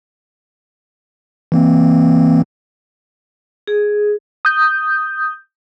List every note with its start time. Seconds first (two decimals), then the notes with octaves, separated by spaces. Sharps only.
1.52 E3 A#3 C4
3.67 G#4
4.45 D#6 G6